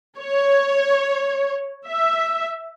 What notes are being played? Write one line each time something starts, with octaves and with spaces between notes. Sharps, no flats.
C#5
E5